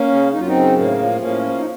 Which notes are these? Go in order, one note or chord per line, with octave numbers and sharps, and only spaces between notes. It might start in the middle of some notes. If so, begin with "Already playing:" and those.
Already playing: A#3 C#4
C#3
F#2 D#4
F4
C4 D#4
C#3
A2 A#3
F3
A2 A#3 C#4
F3
D#4